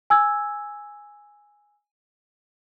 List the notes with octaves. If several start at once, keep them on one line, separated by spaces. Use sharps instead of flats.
G#5 E6 G#6